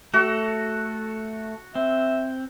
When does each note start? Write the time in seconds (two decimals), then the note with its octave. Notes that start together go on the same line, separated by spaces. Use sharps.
0.14 A3 F#4 A4
1.75 C4 E5